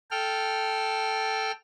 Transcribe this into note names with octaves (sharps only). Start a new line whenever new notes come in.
A4 G5 F6